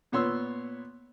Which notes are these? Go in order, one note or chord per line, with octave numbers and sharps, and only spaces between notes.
A#2 B3 C#5 C6 E6